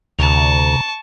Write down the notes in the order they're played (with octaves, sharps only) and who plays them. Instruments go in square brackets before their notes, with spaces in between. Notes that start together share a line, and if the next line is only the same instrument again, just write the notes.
[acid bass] D2 [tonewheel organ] C3 A#5 [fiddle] A5 C#6